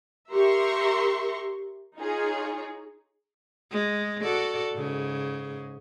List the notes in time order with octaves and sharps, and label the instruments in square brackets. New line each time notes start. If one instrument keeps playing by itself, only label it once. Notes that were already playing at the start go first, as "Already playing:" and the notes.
[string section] G4 A#4 E5 A#5 C6 C#6
D#4 F4 G#4 C#5
[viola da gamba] G#3
F#4 A4 D5
G#2 C#3